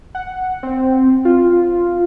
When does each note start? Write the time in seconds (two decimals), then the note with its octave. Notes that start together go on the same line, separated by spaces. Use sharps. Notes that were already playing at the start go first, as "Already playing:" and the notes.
0.15 F#5
0.63 C4
1.25 F4